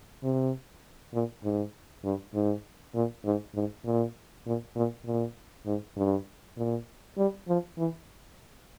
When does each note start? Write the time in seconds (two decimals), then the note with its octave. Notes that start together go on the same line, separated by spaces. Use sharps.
0.23 C3
1.13 A#2
1.44 G#2
2.04 G2
2.34 G#2
2.95 A#2
3.25 G#2
3.55 G#2
3.85 A#2
4.46 A#2
4.76 A#2
5.06 A#2
5.66 G#2
5.97 G2
6.57 A#2
7.17 G3
7.48 F3
7.78 E3